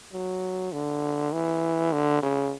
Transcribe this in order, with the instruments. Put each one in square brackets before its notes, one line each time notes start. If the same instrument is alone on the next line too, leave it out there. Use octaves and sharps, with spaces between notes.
[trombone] F#3
D3
E3
D3
C#3